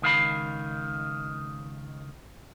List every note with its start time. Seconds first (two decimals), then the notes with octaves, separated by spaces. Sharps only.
0.02 C#2 D#3 F5 B5